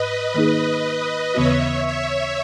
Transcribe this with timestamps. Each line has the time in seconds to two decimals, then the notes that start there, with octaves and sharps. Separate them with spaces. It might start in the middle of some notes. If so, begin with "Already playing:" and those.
Already playing: G#2 B4 D#5
0.34 D#3 A#3 D#4 G#4
1.35 D#2 C#3 E3 B3 F#4 C#5 E5
1.85 C#5 E5